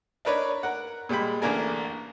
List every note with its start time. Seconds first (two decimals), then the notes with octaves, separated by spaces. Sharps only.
0.25 D4 D#4 A#4 B4 C#5 D5
0.63 A#4 F#5
1.09 A#2 G3 G#3 G5 B5
1.42 A1 D3 A#3 D4 A#4 G#5